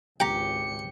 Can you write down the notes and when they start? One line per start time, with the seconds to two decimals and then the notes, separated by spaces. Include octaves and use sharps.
0.20 G#1 C#2 G4 G5 A#5 C#7